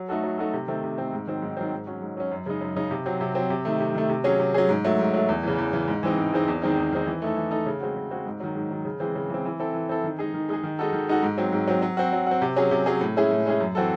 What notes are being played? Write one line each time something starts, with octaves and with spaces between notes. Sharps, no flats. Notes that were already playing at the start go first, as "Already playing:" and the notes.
Already playing: F#3
A3 D#4 F#4 A4
F#3
A3 D#4 F#4 A4
C3
D#3 A3 C4
C3
D#3 A3 C4
G#2
D#3 F#3 C4
G#2
D#3 F#3 C4
G#2
F#3 C#4
G#2
F#3 C#4
F#2
C#3 G#3 D#4
F#2
C#3 G#3 D#4
C3
F#3 C4
C3
F#3 C4
C3
D#3 A3
C3
D#3 A3
C3
F#3 C#4 G#4
C3
F#3 C#4 G#4
G#2
F#3 A3
G#2
F#3 A3
E2
C#3 E3
E2
C#3 E3
G#2
E3 G#3 C4 D#4
G#2
E3 G#3 C4 D#4
E2
D#3 G#3 C4 D#4
E2
D#3 G#3 C4 D#4
E3
A3 D#4 A4
E3
A3 D#4 A4
C#3
G#3 C4 F#4
C#3
G#3 C4 F#4
G#2
D#3 F#3
G#2
D#3 F#3
C#3
E3 G#3 C4
C#3
E3 G#3 C4
E3
C4 E4 A4
E3
C4 E4 A4
D#3
G#3 D#4 G#4
D#3
G#3 D#4 G#4
D#3
G#3 D#4 F#4 A4
D#3
G#3 D#4 F#4 A4
G#2
F#3 C4
G#2
F#3 C4
F#3
C4 F#4
F#3
C4 F#4
C3
F#3 C#4 G#4
C3
F#3 C#4 G#4
A2
G#3 C#4 E4 G#4
A2
G#3 C#4 E4 G#4
F#2
E3 C4 F#4 A4